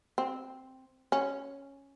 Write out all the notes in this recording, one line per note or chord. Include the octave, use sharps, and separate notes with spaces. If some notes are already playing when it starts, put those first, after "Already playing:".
C4
C#4